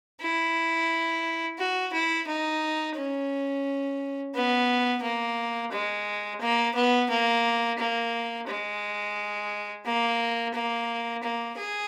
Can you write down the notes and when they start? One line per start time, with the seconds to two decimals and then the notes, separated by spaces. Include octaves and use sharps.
0.21 E4
1.58 F#4
1.93 E4
2.27 D#4
2.96 C#4
4.35 B3
5.03 A#3
5.72 G#3
6.41 A#3
6.75 B3
7.10 A#3
7.78 A#3
8.47 G#3
9.86 A#3
10.54 A#3
11.23 A#3
11.57 G#4